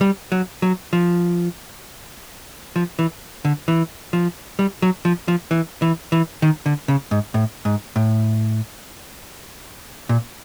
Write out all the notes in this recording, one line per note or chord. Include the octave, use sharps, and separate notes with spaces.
G3
F#3
F#3
F3
F3
E3
D3
E3
F3
G3
F#3
F3
F3
E3
E3
E3
D#3
D3
C#3
G#2
A2
G#2
A2
A#2